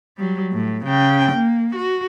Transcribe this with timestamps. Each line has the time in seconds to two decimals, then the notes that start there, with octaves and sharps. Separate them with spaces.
0.18 F#3 G3
0.53 A2
0.85 C#3 G5
1.32 A#3
1.76 F#4